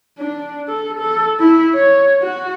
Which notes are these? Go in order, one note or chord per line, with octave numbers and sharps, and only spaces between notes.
D4
A4
A4
E4
C#5
F#4